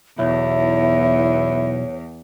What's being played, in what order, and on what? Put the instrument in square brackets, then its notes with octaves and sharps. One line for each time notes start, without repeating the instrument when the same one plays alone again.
[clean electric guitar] B1 [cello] E2 [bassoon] E4 [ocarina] C#5